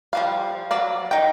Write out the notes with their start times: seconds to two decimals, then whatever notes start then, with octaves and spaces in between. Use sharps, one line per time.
0.13 F3 G3 F5
0.71 F#3 D5 F5
1.11 D#4 G5